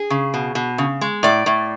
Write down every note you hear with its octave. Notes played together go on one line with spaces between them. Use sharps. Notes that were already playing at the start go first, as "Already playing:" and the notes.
Already playing: G#4
C#3
B2
B2
C#3
G#3
A2 D5
A2